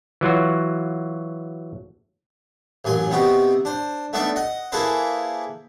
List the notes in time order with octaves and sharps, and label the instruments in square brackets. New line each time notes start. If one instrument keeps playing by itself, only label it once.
[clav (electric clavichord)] E3 F#3 F4 F#4
[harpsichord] A1 F#2 G#5 C6
C3 B3 C4 D#4 F#4
D4 C5
A3 B3 D4 D#4 D5 E5
D#5 F#5
A#3 E4 G#4 A4 B4 C5